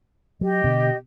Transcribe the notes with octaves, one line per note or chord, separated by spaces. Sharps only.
F#3 G4 D#5
B2 D3